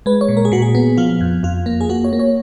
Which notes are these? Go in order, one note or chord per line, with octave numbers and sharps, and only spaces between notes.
G#3 B4
C#5
A#2
A#4
G#4
A#2 F#4
G#4
B3
F3 F4
F2
F2 F4
A#3
G#4
A#3 F#4
C#5
A#3
C#5